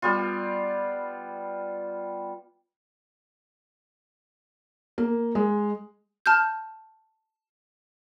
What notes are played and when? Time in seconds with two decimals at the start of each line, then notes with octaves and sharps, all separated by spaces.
0.02 G3 B3 F4
4.98 A#3
5.35 G#3
6.26 A5 F6 G6